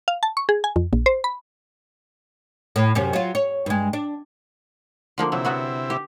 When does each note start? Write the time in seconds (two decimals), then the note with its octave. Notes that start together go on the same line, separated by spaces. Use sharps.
0.08 F5
0.23 A5
0.37 C#6
0.49 G#4
0.64 G#5
0.76 F2
0.93 A#1
1.06 C5
1.24 B5
2.76 A2
2.95 F#2 C3 C#4
3.13 F#3 F4
3.35 C#5
3.66 G2 G#3
3.93 D4
5.18 D3 F3 A#3
5.32 C3 F#3 E4
5.45 F#3 B3 F#4
5.90 G4